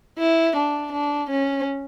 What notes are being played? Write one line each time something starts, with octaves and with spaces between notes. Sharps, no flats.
E4
D4
D4
C#4